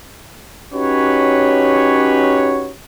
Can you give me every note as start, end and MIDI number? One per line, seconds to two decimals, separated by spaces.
0.74 2.73 61
0.74 2.73 63
0.74 2.73 66
0.74 2.73 67
0.74 2.73 71
0.74 2.73 73